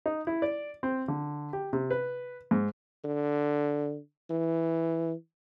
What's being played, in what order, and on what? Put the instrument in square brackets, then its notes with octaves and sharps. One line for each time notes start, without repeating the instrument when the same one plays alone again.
[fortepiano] D#4
E4
D5
C4
D3
G4
C3
B4
G#2
[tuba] D3
E3